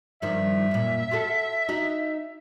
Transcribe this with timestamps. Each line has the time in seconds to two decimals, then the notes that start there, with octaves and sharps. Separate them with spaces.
0.22 G2 D#3 F3 E5
0.71 F#2 A#2
1.11 F4 F#4 A4
1.69 D#4 F#4